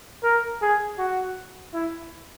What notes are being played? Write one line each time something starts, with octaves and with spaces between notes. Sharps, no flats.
A#4
G#4
F#4
E4